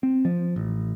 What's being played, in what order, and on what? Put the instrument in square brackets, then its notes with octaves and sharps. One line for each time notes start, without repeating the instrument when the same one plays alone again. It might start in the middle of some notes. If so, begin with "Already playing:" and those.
[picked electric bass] C4
F3
A1